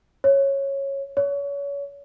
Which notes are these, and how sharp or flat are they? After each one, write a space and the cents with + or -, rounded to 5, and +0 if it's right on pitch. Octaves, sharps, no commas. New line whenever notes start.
C#5 -10
C#5 +30